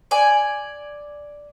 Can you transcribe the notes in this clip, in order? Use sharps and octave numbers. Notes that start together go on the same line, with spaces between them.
D5 G#5